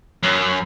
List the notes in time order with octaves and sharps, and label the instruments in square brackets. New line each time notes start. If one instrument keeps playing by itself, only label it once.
[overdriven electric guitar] F#2